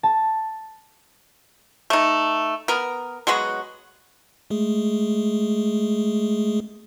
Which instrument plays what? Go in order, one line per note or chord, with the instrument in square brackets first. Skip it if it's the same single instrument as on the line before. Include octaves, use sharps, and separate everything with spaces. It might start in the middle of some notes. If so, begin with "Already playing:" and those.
[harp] A5
[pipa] A3 D#4
B3 A#4
F#3 G#3 B3 F#4
[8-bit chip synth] G#3 A3 G#4